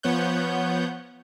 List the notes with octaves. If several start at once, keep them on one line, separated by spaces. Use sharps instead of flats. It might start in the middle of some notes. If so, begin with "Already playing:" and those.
F3 B3 C#5 F#5 G6